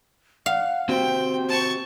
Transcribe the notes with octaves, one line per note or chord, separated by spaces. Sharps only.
F5 F#5
C4 F#4 G4 C5 G5
A5 C#6